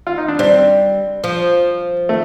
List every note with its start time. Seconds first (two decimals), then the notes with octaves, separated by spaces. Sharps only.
0.07 F4
0.18 D#4
0.28 D4
0.39 G3 C4
1.24 F3
2.09 A3